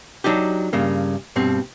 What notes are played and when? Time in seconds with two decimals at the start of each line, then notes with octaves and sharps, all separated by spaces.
0.24 F#3 D4 D#4 G4
0.73 G2 C#3 A#3
1.36 G2 B2 C4